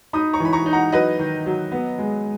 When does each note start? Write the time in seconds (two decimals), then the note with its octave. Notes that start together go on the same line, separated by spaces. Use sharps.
0.13 D#4 B5 D#6
0.33 A#5 C#6
0.40 E3
0.45 B5
0.53 A#5 C#6
0.66 D#4
0.73 F#5 A#5
0.92 F#3 B4 D#5
1.19 D#3
1.46 F#3
1.72 B3
1.98 G#3